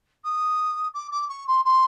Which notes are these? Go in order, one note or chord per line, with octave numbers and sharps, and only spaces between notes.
D#6
D6
D6
C#6
C6
C6